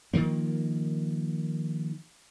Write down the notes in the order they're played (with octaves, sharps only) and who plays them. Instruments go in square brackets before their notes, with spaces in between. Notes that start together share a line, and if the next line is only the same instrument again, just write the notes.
[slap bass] D#3 F3 A#3